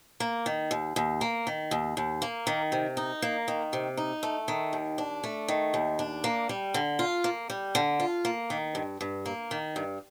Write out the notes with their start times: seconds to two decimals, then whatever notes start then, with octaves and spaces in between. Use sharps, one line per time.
0.20 A#3
0.46 D#3
0.71 D#2
0.96 D#2
1.21 A#3
1.47 D#3
1.71 D#2
1.97 D#2
2.22 A#3
2.47 D#3
2.72 C3
2.97 D#4
3.22 A#3
3.48 D#3
3.73 C3
3.97 D#4
4.23 A3
4.48 D#3
4.73 D#2
4.98 D4
5.24 A3
5.48 D#3
5.74 D#2
5.99 D4
6.24 A#3
6.49 G3
6.74 D3
6.99 F4
7.24 A#3
7.50 G3
7.75 D3
8.00 F4
8.25 A#3
8.50 D#3
8.75 G2
9.01 G2
9.26 A#3
9.51 D#3
9.76 G2